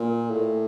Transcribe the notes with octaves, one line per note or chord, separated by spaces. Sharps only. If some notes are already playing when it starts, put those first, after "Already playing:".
Already playing: A#2
A2